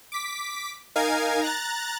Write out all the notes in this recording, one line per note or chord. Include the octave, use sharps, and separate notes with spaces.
D6 B6
D#4 A#4 F5 G#5 G#6
A#5 F#6 A6